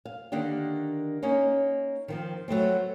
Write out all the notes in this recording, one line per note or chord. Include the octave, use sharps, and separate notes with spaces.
F5
D3 D#3 A#3 D4 G4
A#3 C#4 D#4
D#3 F3 C4
F#3 A3 B3 C4